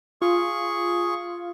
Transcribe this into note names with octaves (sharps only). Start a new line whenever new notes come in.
F4 G#4 C#6